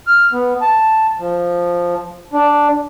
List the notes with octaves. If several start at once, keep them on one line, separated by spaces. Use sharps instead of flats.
F6
B3
A5
F3
D4